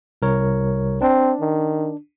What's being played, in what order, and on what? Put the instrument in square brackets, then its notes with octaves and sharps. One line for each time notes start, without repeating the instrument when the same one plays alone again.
[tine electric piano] C2 A#4 C#5
[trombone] C4 [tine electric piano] D4
[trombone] D#3